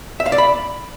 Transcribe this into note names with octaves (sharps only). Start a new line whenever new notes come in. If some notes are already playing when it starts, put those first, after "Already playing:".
E5
F5
D5
B5